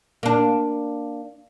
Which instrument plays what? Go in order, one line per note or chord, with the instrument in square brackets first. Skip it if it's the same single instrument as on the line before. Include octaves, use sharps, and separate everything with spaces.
[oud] A#3 D4